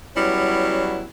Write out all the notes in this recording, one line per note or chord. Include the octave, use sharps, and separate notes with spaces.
F#3 G3 B3 C#4 E4